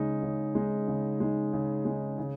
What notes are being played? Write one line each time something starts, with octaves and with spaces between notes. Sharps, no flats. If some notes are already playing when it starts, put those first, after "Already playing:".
Already playing: C#3 G#3 D#4
C#3
G#3 D#4
C#3
G#3 D#4
C#3
G#3 D#4
C#3